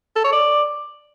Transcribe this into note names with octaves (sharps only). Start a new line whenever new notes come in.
A4
C#5
D5